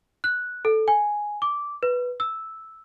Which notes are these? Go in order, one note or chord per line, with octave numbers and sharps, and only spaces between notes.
F#6
A4
G#5
D6
B4
E6